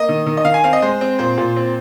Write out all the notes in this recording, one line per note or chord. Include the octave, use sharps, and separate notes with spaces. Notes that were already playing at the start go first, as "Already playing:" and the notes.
Already playing: A#3 D#5
D#3
D#3
D#5
D#3 F5
G#5
C4 F5
D#5
G#3 C5
C4
A#2 C5
A#2
C4